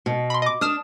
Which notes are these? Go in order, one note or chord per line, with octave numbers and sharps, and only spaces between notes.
B2
B5 C6
D#5 D6
D4 D#6 F6 E7